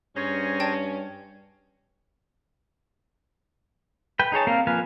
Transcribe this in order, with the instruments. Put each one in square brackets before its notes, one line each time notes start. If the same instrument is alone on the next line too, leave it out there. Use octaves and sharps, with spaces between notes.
[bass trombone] G2 [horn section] C#4 [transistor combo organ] G#4 C5 A#5
[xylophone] D5 G5 A5
[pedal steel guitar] B4 G5
D#4 G#4 C#5 A5
A#3 C4 A#4 F5
F3 A#3 B4 F5 G#5